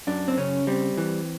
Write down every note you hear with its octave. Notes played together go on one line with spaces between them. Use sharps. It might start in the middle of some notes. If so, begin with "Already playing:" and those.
F#2 D4
C4
C#3 C#4
G3 C4
E3